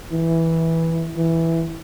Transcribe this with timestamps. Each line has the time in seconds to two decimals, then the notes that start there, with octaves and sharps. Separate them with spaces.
0.11 E3
1.17 E3